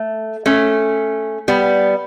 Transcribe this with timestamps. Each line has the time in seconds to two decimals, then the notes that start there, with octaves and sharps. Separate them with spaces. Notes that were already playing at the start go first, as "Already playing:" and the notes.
Already playing: A3
0.46 A3 C#4
1.48 G3 B3